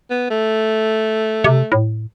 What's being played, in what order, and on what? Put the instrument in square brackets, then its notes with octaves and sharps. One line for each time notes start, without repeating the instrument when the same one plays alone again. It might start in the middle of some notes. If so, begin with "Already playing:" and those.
[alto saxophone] B3
A3
[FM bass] C3
A2